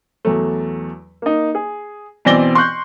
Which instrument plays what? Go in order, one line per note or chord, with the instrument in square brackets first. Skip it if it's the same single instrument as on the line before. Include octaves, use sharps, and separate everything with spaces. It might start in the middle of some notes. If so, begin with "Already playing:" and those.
[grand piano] E2 F#3 A3
A#3 D#4
G#4
B2 E3 C4 D5 A#6 G7
C6 C#6 F#6 G6